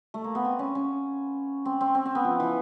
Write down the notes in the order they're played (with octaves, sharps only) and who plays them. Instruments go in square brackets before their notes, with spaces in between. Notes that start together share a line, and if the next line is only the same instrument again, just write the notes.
[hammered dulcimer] A3
A#3
B3
C4
C#4
C#4
C4
C4
C4
C4
B3
F3
E3